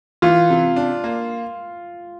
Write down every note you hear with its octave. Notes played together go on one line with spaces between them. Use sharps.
E3 F4
C3
D4
A#3